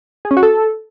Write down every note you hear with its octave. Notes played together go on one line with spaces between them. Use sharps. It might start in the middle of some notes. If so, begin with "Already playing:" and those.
G#4
C#4
F#4
A4